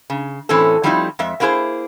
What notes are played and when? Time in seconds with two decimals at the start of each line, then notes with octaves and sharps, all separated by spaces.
0.10 C#3
0.49 A2 E3 C4 C#4 A4
0.83 F3 G3 A3 C4 D#4 E4
1.19 F2 G#3 E5
1.40 A#3 C4 E4 F4 G#4 C5